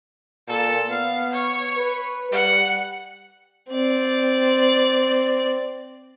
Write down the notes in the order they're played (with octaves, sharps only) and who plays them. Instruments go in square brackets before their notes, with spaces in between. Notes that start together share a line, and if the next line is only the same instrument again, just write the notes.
[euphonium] A#2 [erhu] A4
[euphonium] B3 [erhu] F5
[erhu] C#5
[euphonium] B4
[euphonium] G3 [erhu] F#5
[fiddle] C4 D5